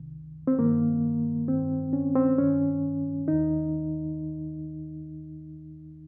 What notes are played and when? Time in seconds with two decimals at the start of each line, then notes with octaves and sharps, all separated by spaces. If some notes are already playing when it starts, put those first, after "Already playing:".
Already playing: C2 C3 D#3
0.47 C4
0.59 G2 D#3 A#3
1.48 G2 D#3 C4
1.93 C#4
2.15 C4
2.38 G2 D#3 C#4
3.28 D#2 D#3 D#4